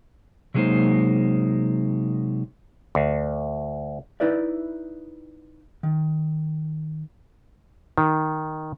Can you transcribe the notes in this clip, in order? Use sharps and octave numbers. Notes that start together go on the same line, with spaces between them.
C3 F#3 G#3 A#3 D#4 C5
D2
D#4 E4 B4 D5 E5
D#3
D#3